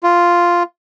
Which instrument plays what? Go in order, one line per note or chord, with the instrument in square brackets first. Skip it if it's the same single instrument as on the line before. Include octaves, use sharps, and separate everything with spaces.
[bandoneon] F4